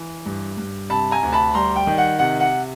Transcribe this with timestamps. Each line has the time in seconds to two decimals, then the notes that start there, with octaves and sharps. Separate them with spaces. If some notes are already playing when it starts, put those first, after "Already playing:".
Already playing: E3
0.26 G2
0.57 G2
0.90 C3 A5 B5
1.11 G#5 A#5
1.23 D2
1.33 A5 B5
1.54 G3 A#5 C6
1.76 G5
1.87 D#3
1.98 F#5
2.19 C3 F#5
2.40 F#5